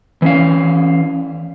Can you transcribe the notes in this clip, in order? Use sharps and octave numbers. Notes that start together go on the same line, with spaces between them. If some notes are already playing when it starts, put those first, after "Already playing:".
E3 C#4 F5